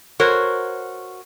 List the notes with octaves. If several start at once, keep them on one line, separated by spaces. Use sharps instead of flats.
F#4 A#4 C5 C#5